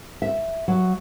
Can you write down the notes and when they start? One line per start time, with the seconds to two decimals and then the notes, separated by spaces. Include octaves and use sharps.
0.22 E5
0.68 F#3